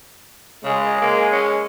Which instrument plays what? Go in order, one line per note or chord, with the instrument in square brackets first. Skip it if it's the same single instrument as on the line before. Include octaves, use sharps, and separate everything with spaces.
[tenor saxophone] C#3 [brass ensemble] G#3
[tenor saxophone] A#3
C#4